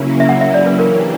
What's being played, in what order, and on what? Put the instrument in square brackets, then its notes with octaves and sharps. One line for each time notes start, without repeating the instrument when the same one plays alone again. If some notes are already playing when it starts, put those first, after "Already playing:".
Already playing: [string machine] C#3 F#3 A#3 C#4 E4
[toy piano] E5
F#5
E5
D5
B4
[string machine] E3 A#3 D4 G4 [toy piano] A#4